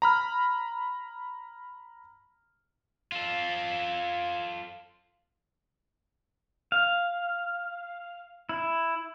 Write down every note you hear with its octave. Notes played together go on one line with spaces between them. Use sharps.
A#5 B5 F6
F4 A4
F5
E4